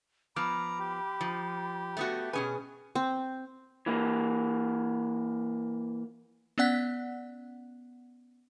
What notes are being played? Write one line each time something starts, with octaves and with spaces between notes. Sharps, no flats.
F3 B3 A#5 B5 D6 F6
G4
F3
A3 B3 F#4
B2 C#4 G#4 B4 G#5
C4
E3 A#3
B3 C#4 D5 F#5 F#6 B6